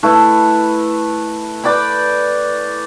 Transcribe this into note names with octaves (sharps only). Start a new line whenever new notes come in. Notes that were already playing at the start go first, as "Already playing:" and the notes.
A3 E4 B4
B4 D5 G5 B5